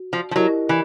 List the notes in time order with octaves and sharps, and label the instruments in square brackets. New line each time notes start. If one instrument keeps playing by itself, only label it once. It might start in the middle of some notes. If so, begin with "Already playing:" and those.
Already playing: [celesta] F#4
[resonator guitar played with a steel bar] F3
F3
[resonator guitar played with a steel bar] F#3 [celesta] E4 G4 A#4 D#5
[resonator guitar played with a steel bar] E3